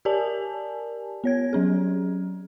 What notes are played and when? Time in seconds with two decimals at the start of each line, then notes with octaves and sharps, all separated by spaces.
0.05 G4 A#4 D5 G#5 A5
1.24 B3 C#5 G#6
1.53 F#3 C#4 G#4